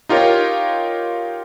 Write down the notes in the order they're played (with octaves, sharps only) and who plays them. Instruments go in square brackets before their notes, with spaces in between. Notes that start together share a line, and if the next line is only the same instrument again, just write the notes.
[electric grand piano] D#4 F4 G4 A#4 C#5